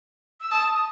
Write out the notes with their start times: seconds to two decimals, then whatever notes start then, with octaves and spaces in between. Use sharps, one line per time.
0.41 E6
0.51 A5 D#6
0.74 D#6